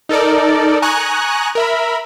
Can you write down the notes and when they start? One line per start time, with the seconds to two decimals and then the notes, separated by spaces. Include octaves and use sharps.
0.09 D#4 A4 A#4 D5
0.82 G#5 A#5 C#6 D#6 F#6
1.55 A#4 E5 B5